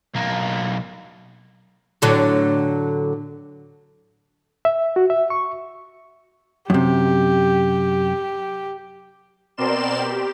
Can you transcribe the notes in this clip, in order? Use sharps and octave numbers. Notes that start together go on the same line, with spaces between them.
B1 A#3
A2 D3 F#3
E5
F#4
E5
C#6
F#2 C3 G4
B2 C4 A#4 D5 C6 E7
G4